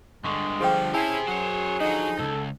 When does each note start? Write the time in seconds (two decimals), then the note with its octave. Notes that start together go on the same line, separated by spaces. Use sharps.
0.24 G2 D3 G#3 C#6
0.61 F3 G#4 G5
0.94 C#4 E4 G4 G#4 C5 A5
1.27 F#2 F#3 C5 C#5
1.81 D3 F3 F#3 D#4
2.19 C#2 G#2 A4